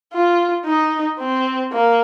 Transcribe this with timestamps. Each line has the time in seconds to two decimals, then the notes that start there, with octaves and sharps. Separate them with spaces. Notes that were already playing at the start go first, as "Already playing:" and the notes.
0.13 F4
0.65 D#4
1.19 C4
1.73 A#3